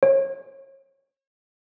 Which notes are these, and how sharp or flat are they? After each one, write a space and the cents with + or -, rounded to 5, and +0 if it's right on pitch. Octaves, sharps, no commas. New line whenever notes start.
C#5 -35